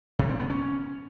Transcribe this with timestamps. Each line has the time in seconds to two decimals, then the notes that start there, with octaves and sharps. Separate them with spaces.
0.19 C3
0.29 C4
0.39 B3
0.50 C#4